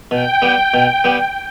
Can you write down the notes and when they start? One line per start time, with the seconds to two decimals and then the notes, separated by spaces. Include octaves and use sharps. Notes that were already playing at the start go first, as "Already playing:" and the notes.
0.11 B2 G5
0.42 G3 B3
0.74 B2
1.04 G3 B3